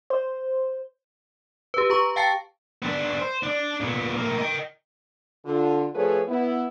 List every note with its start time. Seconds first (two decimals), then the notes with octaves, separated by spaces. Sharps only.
0.10 C5
1.74 G4 B4
1.90 G4 A#5 C#6
2.16 F5 G5 A5 A6 C7 C#7
2.82 B3 D4
3.19 C5
3.43 D4 D5
3.81 A#2 B3
4.17 A2 A#3
4.38 D#5 G5
5.45 D3 F4
5.94 F3 A3 G#4 A4 B4 C#5
6.28 B3 E4